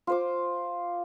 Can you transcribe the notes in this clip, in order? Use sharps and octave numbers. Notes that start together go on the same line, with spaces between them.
F4 C5 D6